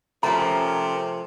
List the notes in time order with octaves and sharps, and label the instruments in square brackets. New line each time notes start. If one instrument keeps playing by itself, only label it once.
[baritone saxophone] C3 [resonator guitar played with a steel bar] F3 A3 [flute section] C#4 A#4 [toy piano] A#5